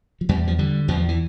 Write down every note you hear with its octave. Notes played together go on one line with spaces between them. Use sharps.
F3
E2 G3
F3
D3 G3
E2 F3
E3